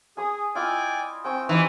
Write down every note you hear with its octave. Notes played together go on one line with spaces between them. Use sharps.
G#4 G#5 D#6
E4 F4 D5 D#5 G5 G#5
C4 G5 G#5 C#6
E3 D#4 E4 G4